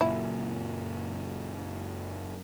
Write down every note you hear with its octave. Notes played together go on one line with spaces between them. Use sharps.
F#1 F#2 A#2 E4